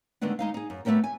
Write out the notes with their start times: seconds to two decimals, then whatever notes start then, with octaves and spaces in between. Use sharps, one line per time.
0.21 D3 D#3 G#3 A3 B3 D4
0.39 G#3 D#4 F5
0.54 D#4 G#4
0.70 F#2
0.85 G3 A3 B3 C#4 G4 A#4
1.04 G#5